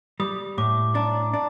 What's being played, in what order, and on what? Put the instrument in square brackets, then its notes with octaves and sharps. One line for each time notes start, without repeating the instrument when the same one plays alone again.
[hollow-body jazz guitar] G3 [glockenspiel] D#6
[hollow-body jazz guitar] A2 [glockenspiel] D6
[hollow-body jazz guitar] D4 [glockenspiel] A#5
[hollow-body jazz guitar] D4